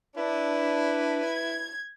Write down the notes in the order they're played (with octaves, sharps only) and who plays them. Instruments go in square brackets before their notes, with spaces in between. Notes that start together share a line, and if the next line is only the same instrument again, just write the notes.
[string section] D4 [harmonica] E4 [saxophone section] B4
[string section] G#6